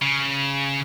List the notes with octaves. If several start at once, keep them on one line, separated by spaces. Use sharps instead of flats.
C#3